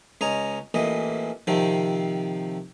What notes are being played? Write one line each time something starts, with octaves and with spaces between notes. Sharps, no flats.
C#2 C#4 D#5 G#5 A#5
A1 A#2 E3 D#5
C3 D#3 F3 C4